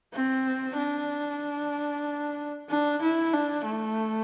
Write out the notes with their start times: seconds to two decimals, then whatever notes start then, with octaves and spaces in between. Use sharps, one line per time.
0.14 C4
0.77 D4
2.69 D4
3.02 E4
3.33 D4
3.65 A3